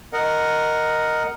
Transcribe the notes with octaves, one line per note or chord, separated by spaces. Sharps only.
A#4 D#5 F#5